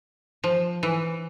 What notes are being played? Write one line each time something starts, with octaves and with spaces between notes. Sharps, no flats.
F3
E3